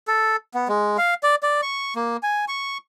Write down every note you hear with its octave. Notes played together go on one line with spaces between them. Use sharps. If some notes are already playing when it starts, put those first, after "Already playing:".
A4
B3
G#3
F5
D5
D5
C#6
A#3
G#5
C#6